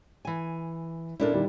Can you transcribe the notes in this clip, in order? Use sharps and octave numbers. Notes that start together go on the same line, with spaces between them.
E3 G#5
A#2 C#4 D4 E4 A4 A#4
D3 D#3 G3